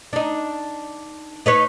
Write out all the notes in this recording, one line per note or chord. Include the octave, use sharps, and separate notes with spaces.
D4 D#4
D#4 B4 C#5